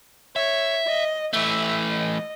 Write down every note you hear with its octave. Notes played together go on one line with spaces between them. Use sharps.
C#5 E5
D#5
E3 A3 E5
D#5